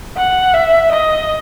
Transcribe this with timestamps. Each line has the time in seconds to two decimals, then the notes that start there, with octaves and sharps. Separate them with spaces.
0.17 F#5
0.54 E5
0.92 D#5